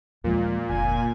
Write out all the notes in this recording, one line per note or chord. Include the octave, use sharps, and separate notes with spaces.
D#2 A#2 F3 G#3
F1 D2 G#5